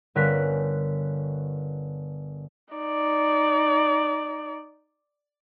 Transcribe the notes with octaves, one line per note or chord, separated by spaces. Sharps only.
G1 D3 C#4 A#4 F#6 B6
D#4 D5